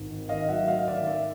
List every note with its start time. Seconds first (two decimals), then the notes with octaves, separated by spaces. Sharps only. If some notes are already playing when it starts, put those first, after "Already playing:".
Already playing: G#1
0.10 D#3
0.29 D#3 D#5 F5
0.49 F#3 E5 F#5
0.68 G#2 D#5 F5
0.79 F5
0.88 D#3 D5 E5
1.07 G#2 D5 E5